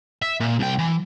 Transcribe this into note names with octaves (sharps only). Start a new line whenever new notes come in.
E5
A#2
C2 G5
E3